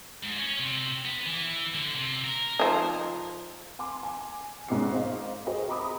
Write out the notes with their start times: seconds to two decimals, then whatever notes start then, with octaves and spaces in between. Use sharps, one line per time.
0.23 G#2
0.38 C#4
0.60 C3
1.05 B3
1.26 E3
1.75 D3
1.95 C3
2.24 A#4
2.59 F3 D#4
3.79 G#5 C6 D6
4.03 G#5
4.68 G#1 G#2 B2 C#4 D6 C7
4.92 C5 D#5 F5
5.47 F#4 G#4 B4 C5 D#5
5.68 D#5 A#5 B5 D6 D#6